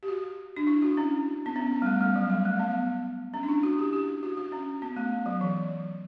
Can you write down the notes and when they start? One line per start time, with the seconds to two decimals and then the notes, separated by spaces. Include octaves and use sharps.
0.03 G4
0.08 F#4
0.56 D4
0.67 E4
0.82 F#4
0.97 C#4
1.46 B3
1.56 C#4
1.72 B3
1.82 G3
1.86 A3
2.01 G3
2.16 F#3
2.30 G3
2.45 A3
2.59 B3
3.34 C#4
3.43 D4
3.49 E4
3.63 F#4
3.79 G4
3.93 G4
4.23 F#4
4.37 F#4
4.52 C#4
4.82 B3
4.96 A3
5.26 F#3
5.41 E3